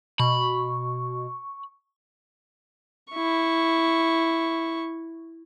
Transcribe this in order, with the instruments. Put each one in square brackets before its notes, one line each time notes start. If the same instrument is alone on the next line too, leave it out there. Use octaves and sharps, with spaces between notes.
[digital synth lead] B2 [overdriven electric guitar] B5 [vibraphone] C#6
[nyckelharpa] E4 C#6